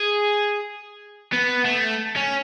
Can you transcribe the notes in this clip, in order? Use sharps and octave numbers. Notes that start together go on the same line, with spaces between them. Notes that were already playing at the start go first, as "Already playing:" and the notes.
Already playing: G#4
B3
A3
C#4